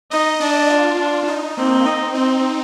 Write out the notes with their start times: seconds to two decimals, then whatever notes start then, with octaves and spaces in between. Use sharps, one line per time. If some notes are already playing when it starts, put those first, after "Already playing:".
0.11 D#4 D#5
0.40 D4 D5
0.70 F4
0.99 D4
1.28 D#4
1.57 A#3 C4
1.85 C4 D#4
2.15 C4 D#4